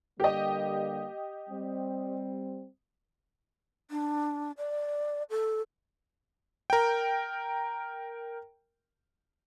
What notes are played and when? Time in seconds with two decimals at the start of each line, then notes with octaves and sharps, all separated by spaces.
0.20 D3 G3 A#3 G4 D#5
1.50 G3 C4
3.90 D4
4.58 D5
5.30 A4
6.70 A#4 G5